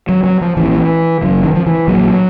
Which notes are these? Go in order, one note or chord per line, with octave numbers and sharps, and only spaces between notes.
F#3
F#3
F3
A#1 A#2 E3
F#1 F#2 C#3
D#3
F3
E3
A#1 A#2 F#3